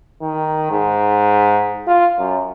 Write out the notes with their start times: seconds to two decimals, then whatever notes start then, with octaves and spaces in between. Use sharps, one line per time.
0.22 D#3
0.71 G#2
1.87 F4
2.18 F#2